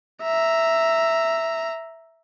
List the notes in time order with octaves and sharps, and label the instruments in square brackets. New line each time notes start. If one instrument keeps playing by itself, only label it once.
[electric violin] E5 A#5